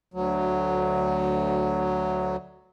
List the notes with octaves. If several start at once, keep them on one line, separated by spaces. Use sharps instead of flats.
D2 F#3